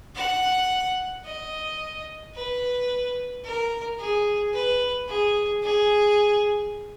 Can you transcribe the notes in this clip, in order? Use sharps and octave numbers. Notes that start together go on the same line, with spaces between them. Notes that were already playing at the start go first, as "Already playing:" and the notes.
F#5
D#5
B4
A#4
G#4
B4
G#4
G#4